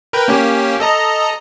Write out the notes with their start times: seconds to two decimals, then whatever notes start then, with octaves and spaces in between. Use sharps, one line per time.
0.13 A#4 B4 G5
0.28 A#3 C#4 G4
0.80 A4 D#5 A#5